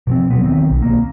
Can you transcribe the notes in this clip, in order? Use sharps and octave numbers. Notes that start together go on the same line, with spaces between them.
B2 F3 C4
D#1 F#3 B3
D#3 C4
B1
A#3